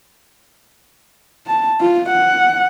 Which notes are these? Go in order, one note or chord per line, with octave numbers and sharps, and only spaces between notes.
A5
F4
F#5